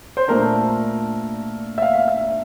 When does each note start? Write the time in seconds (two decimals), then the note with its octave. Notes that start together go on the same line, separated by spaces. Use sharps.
0.17 C5
0.28 A#2 A3 D4 A#4
1.78 E5
1.82 F5
1.95 F5
2.08 E5